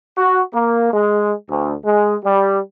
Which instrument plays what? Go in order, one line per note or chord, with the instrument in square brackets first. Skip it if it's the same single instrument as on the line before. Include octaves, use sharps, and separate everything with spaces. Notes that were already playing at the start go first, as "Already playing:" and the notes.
[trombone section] F#4
A#3
G#3
D2
G#3
G3